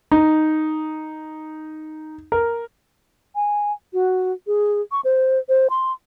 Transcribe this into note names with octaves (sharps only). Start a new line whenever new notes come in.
D#4
A#4
G#5
F#4
G#4
C#6
C5
C5
C6